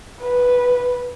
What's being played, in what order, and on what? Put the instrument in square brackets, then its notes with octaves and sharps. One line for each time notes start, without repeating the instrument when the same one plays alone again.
[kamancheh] B4